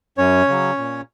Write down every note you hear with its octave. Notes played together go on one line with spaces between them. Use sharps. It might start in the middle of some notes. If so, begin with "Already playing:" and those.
F#2 C#4 C#5
C#3 F#3
A#2